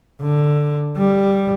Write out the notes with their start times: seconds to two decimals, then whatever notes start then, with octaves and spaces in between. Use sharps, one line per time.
0.21 D3
0.97 G3